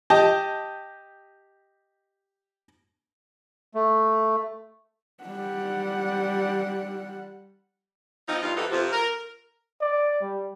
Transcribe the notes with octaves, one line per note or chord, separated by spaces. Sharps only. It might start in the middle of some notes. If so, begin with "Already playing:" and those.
G4 D#5 A5
A3
G3 F#5
F3 B3 C4 D#4
G2 F4
E3 F3 B3 D#4 G4 A4
F2 C3 F3
A#4
D5
G3